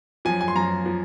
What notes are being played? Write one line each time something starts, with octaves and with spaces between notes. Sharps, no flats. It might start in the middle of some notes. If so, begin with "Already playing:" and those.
F#2 F3 G#5
G#5
C6
F#2 F3 A#5
F3